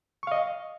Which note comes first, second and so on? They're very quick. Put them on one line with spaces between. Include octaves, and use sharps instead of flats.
C#6 F5 D#5